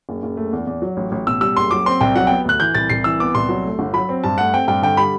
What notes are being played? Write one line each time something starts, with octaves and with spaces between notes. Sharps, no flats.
F#1
F#1
A3
E2
E2
F#3
A1
A1
B2 E6
G3 E6
F#1 C6
F#3 D6
C4 C6
C2 G5
F#3 F#5
B3 G5
D2 F#6
E3 G6
C2 A6
C2 C7
E3 E6
B3 D6
C2 C6
F#3
A3
G1
F#3 B5
C4
G2 A5
A3 F#5
C4 G5
G2 G5
D3 G5
G3 B5